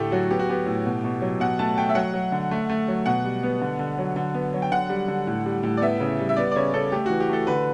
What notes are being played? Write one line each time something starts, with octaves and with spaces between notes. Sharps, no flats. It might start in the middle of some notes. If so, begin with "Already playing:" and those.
Already playing: A2 D3 A3 G4 A4
F#3 F#4
B3 G4
F#4
B3 G4
A2
B2
B2
F#3
B2 F#5
A3 A5
A3 G5
E5
F#3 F#5
F#3
D3
A3
A3
F#3
B2 F#5
G3
B3
D3
D3
F#3
D3
B3
F#3
G5
D3 F#5
G3
D3
A2
G3
A2
D5
B3 E5
C#3
G3
E5
B3 D5
D5
C#3 C#5
C#3 A4
A3 G4
E3 F#4
G4
A3 A4
D3 B4